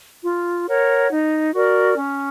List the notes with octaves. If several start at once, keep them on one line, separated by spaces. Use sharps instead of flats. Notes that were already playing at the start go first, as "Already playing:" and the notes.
F4
A#4 C#5 F#5
D#4
F#4 A#4 D5
C#4